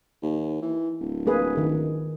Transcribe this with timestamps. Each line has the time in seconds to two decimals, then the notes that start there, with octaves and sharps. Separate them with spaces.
0.22 D#2
0.62 E3
1.01 D1
1.27 A#3 G#4 B4
1.57 D#3